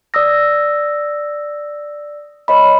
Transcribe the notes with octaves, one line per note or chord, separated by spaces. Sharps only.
D5 D#6 E6 A#6
C#5 D#5 B5